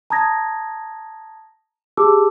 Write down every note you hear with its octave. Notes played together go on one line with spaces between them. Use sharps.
A5 A#5 D#6 G#6 A#6
G4 G#4 A5 D6 E6